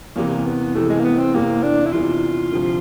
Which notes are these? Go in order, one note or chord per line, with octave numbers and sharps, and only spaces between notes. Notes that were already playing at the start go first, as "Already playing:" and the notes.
E2 C3 E3 A#3
B3
E2 C3 E3 A3
G#3
A#3
B3
C4
E2 C3 E3 A#3
D4
E4
E2 C3 E3 F4
D2 C3 F3